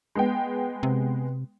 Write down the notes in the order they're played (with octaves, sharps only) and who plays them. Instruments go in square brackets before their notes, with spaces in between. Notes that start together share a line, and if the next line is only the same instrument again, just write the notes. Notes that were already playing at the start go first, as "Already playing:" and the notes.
[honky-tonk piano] G#3 B3 G5
[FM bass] C3